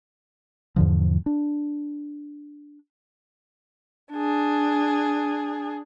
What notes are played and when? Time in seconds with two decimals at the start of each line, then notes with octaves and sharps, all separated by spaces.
0.76 E2 G#2 D3 F3
1.26 D4
4.12 D4 G#4